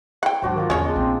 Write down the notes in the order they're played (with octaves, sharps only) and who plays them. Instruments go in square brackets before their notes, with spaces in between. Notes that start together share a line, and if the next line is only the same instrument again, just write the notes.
[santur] E4 [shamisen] F#5 G5
[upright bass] G#2 F#3 [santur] D4 F#4 C5
[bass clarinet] D#3 [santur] A#3 D4 F4
[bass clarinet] E2 [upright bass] D3 F3 [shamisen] C#4 C#5 [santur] D#5
[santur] G#3 D4
[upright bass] A#1 [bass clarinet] C4